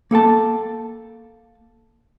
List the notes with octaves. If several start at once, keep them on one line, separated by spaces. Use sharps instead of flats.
A#3 A4 G5 A5